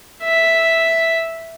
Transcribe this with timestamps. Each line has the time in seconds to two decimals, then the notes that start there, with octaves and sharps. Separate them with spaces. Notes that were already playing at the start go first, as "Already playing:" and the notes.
0.23 E5